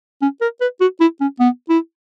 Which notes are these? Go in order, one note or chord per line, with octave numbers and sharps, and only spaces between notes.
C#4
A#4
B4
F#4
E4
C#4
B3
E4